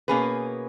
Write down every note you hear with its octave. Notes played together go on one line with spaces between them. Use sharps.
B2 A#3 C#4 G#4 B4